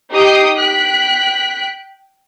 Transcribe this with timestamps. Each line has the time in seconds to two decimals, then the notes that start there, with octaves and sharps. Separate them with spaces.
0.10 D#4 G4 G5 D#6 G6 C7
0.56 G5 F#6 B6